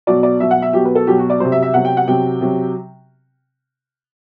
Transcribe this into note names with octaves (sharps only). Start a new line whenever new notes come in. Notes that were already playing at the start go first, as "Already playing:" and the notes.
B2 F#3 D5
D5
B2 F#3 E5
F#5
E5
B2 F#3 G4
B4
A4
B2 F#3 G4
F#4
D5
C3 F#3 C5
E5
E5
C3 F#3 F#5
G5
F#5
C3 F#3 G5
C3 F#3